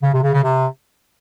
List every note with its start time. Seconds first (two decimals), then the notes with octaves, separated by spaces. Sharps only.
0.03 C#3
0.13 C3
0.23 C#3
0.33 C#3
0.43 C3